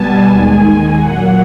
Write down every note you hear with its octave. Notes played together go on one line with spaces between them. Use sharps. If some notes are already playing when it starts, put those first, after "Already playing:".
Already playing: B2 G3 B3 G#5 A5
D#2 D#3 G#3
A#2 F#3 A#3 F#5